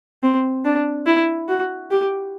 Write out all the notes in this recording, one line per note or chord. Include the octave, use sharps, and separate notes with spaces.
C4
D4
E4
F#4
G4